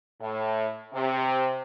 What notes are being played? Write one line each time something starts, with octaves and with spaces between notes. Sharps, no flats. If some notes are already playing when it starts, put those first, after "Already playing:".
A2
C3